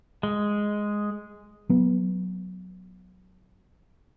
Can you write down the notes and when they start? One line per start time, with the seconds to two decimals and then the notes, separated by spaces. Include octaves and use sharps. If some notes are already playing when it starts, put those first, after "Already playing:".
0.23 G#3
1.69 F#3 B3